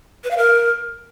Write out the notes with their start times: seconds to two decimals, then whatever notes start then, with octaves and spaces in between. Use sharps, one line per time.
0.24 B4
0.31 F5
0.37 A#4